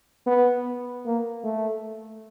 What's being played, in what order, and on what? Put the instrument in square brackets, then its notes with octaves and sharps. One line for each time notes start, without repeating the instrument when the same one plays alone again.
[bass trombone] B3
A#3
A3